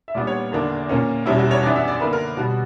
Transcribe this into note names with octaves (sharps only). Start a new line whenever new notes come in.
E5
A#2 G3 B3 D4 D5
C#5
E2 D3 A#3 D4
A#2 A#3 C#4
E2 B2 G3 C#4 E4
F#4
C#5
F#2 E3 B3 D4 D5
E5
D5
D3 A#3 D4 B4
A#4
B2 G3 B3 F#4